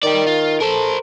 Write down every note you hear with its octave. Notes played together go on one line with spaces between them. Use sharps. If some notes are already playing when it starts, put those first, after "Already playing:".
D#3 G4 D5
F4
A4 A#4 C5